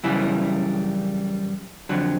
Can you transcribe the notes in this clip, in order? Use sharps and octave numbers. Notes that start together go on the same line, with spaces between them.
F#2 C#3 E3 G3 E4
F2 D3 F#3